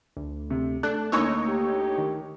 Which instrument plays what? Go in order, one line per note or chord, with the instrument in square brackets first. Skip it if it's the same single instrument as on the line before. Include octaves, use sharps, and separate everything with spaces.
[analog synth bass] D2
[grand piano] C3
[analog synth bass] A3 [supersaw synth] D4 [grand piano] F#6
[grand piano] D2 C#6 E6 [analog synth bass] A#3 [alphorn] C#4 [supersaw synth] D#4 C#5
[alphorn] G4
[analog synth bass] D#3